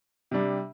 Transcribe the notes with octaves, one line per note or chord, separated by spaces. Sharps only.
C3 G3 D4